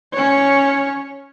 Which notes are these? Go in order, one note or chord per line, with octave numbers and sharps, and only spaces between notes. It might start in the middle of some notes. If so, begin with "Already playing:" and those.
C#4 C#5